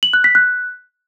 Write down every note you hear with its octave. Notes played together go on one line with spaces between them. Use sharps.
F#7
F#6
B6
F#6